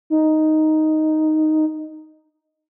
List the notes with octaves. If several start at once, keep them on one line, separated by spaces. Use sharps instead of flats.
D#4